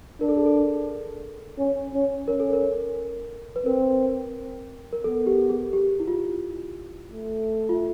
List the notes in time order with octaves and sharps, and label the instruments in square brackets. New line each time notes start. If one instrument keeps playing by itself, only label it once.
[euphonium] D4 [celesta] A#4
[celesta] A4
G#4
A4
[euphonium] C#4
C#4
[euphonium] C#4 [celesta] A#4
[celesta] A4
A#4
B4
[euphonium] C4 [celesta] A#4
[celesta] A#4
[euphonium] B3 [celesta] A4
[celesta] G4
G#4
G4
E4
F4
[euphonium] A3
[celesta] F4